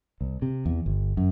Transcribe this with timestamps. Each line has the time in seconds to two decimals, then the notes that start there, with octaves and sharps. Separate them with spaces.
0.21 C2
0.42 C3
0.66 E2
0.86 G1
1.17 F#2